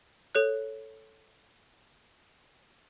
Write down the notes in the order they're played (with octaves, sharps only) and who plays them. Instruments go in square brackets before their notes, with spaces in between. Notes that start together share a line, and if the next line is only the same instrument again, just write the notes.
[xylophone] A4 C#5 F#6